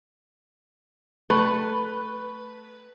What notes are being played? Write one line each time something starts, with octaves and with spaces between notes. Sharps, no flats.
A3 B4